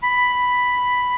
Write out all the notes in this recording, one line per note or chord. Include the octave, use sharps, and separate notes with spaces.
B5